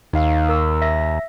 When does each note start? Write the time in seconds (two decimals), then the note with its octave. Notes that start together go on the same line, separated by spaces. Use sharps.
0.13 D#2 D#4 F5
0.49 A#4 E6
0.82 E5 A#6